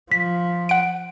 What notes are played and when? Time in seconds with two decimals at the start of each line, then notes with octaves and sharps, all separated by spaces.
0.12 F3 B6
0.69 F#5 D7